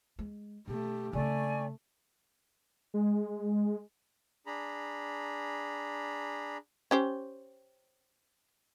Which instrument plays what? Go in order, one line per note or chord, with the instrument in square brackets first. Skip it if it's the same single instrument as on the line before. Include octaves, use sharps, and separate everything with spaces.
[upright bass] G#3
[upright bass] B2 [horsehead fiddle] A3 G4
[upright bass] C#3 C4 [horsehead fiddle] A3 [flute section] D5 G#5 C#6
[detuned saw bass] G#3
[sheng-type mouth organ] D4 G#4 A#5 B5
[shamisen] C#4 G4 C5